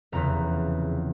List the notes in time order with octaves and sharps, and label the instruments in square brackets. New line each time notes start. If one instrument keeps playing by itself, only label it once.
[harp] F1 E2 C#3 A#5